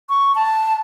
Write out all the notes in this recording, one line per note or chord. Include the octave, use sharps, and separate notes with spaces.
C#6
A5